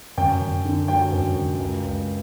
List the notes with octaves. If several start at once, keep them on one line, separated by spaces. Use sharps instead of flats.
F#2 G5
F#2
D3
F#3 G5
F#2
F#2
C#2
C#2